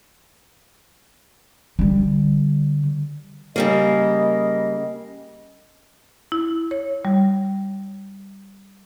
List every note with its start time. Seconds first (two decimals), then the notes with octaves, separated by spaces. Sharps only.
1.79 D3 G3
3.56 C#3 G3 A#3 D#5
6.32 E4
6.71 C#5
7.05 G3